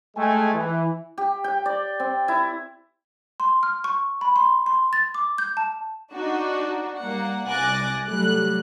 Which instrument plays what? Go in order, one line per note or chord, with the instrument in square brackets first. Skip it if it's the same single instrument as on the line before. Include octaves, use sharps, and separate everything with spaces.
[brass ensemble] G#3 A3 G5 G#5
E3
[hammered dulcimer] G4
G5
D5
C4
E4
[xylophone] C6
F6
C#6
B5
C6
C6
A6
D6
G6
A5
[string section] D4 D#4 F#4
G3 A#3 F#5
C2 G#5 D6 F#6 A6 A#6
F#3 G3 A3 F#6